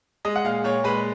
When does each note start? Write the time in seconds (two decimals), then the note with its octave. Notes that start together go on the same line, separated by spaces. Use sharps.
0.25 G#3 D#5
0.36 F#5
0.44 A#2 F5
0.64 A#2 C#5
0.84 G#3 B4